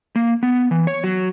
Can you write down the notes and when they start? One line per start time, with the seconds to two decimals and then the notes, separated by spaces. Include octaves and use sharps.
0.16 A#3
0.43 B3
0.71 E3
0.87 C#5
1.04 F#3